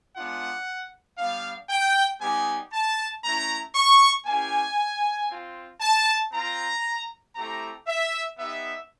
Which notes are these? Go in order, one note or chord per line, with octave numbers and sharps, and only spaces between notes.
G#3 B3 D4 F4 F#5
G3 B3 D4 F5
G5
G3 B3 D#4 G4 G#5
A5
A3 C#4 E4 A#5
C#6
A#3 C#4 E4 G4 G#5
C4 F4
A5
C4 F4 A#5
A3 C4 E4 G4 A#5
E5
B3 D#4 G4 E5